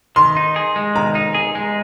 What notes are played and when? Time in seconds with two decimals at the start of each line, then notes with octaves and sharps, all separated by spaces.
0.16 D#3 C6
0.37 D#4
0.56 G#4
0.76 G#3
0.95 D#3 A#5
1.15 D#4
1.34 G#4
1.55 G#3